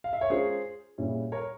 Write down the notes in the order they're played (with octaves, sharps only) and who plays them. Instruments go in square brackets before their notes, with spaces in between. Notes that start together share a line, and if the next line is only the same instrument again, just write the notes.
[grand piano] F5
E5
C#5
[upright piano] G#3 C#4 F4 A#4 [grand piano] G#4 C5
[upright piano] A#2 G3 C#4 E4 G#4
[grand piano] A#4 C#5